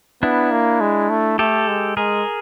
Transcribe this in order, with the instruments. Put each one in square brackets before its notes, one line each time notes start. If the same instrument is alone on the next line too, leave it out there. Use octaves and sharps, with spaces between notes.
[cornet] B3 [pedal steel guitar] D4 E4
[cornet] A#3
G#3
A3
[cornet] A3 [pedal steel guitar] G4 A4
[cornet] G#3
[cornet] G#3 [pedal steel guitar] G#4 A#4